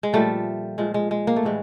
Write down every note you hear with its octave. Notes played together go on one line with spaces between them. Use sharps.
G#3
A#2 F3 G3 A3
A#2 F3 G#3
G#3
G#3
A#3
A3
A2 E3 G3 G#3